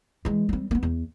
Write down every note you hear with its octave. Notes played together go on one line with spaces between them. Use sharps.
E3 G#3
G3 C4
A#3 B3
E2